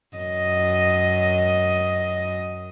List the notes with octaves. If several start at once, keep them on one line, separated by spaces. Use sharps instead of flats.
F#2 D#5